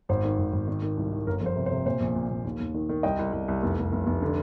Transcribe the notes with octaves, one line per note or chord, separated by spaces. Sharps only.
G#1 C5
D#3
G#1
G#1
D#3
D#3
C2
D#3
G1 A#4
F2 C5
C3
C5
C3
A#2 C5
A#1
A#2
A#2
D#2
D#2
D#3
D#3
C2 D#5 G5
C2
C2
C2
F1
F1
F1
F1
D3